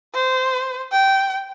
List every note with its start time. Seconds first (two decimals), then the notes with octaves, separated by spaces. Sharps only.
0.14 C5
0.92 G5